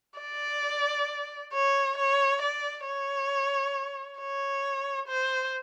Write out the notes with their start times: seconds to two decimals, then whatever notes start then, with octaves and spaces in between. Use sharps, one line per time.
0.20 D5
1.54 C#5
1.98 C#5
2.42 D5
2.86 C#5
4.19 C#5
5.08 C5